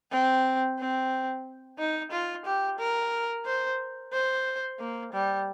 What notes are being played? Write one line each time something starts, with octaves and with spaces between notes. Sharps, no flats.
C4
C4
D#4
F4
G4
A#4
C5
C5
A#3
G3